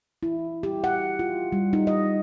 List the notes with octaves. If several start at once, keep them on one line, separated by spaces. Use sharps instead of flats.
E4
G4
F#5
F4
G3
D#4
D#5